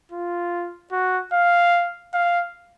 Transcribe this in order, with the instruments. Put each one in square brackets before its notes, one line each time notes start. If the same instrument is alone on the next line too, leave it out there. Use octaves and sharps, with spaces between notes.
[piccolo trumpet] F4
F#4
F5
F5